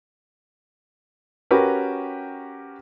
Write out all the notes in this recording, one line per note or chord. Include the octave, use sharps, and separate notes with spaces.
C#4 F#4 G4 A#4 B4